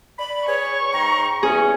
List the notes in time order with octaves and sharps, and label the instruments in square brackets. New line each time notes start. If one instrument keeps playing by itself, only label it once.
[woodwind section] D5 B5
[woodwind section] G#4 B4 C#5 [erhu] C#6
[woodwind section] G#2 G5 A#5
[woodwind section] E2 C#4 [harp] G#4